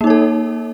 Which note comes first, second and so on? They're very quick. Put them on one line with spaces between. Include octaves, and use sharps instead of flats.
A#3 D#4 C#5 A4